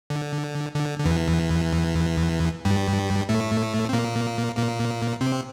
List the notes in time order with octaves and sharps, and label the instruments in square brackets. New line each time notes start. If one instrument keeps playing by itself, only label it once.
[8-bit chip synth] D3
D3
D3
E2 E3
G2 G3
A2 A3
C4
A#2 A#3
A#2 A#3
C3 C4